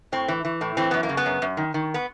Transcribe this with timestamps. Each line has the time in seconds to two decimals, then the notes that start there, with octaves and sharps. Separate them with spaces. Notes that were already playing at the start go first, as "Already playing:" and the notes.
0.12 A2 C4
0.28 E3
0.45 E3
0.61 A2
0.77 E3 C4
0.91 F#2 B3
1.03 A#3
1.09 C#3
1.17 B3
1.26 F#2
1.42 F#2
1.57 D#3
1.74 D#3
1.94 B3